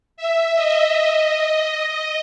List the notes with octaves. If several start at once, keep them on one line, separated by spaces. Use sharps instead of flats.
E5
D#5
D#5
D#5
D#5